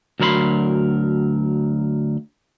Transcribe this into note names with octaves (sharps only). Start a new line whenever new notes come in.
D2 F#3 A#4 B4 B5 C6